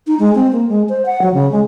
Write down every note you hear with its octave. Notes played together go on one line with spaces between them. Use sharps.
D#4
G#3
C4
A#3
G#3
C5
F#5
F#3
C#3
G#3